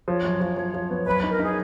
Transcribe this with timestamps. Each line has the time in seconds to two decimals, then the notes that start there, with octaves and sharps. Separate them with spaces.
0.08 F3 C#5
0.25 F#2
0.41 F3
0.57 F3
0.74 F3
0.90 B3
1.06 F#2 B4
1.23 D#4
1.31 A#4
1.39 D#4 G#4